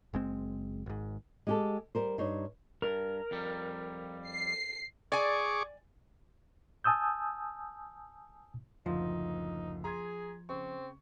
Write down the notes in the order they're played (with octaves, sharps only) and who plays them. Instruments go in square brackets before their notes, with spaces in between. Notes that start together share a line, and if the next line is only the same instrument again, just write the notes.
[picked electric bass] F#1 G#3 C4
G#1 G#2
[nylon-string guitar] G#3 G4 A4
G3 A#4 C5
G2 D#4 C5 C#5
[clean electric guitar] G2 [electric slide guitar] A#4
[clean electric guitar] F2 G3
[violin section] C7
[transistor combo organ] G#4 C#6 D6 [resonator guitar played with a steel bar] D5 G#5
[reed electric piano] G#5 A5 D#6 E6 G6
[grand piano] F#1 D2 [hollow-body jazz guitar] F3 [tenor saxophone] D#4
[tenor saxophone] G#4 [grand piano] A#5 C6 G#6
[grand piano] C#3 C#6 [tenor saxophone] C4